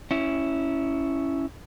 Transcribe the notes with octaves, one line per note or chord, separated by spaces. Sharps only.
C#4 E4